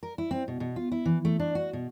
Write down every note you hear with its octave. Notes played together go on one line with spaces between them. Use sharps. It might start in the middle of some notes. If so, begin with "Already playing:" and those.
A#4
E4
C4
B2
B2
F4
E4
E3
A3
D4
F#4
B2